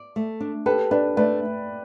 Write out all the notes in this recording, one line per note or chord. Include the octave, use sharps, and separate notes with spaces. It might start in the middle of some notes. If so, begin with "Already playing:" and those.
Already playing: D5
A3
D4
G4 A4 B4
D4 B4 D5
A3 B4 D5